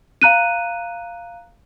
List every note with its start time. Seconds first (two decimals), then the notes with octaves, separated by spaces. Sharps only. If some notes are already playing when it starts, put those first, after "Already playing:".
0.22 F5 A#5 F#6 D#7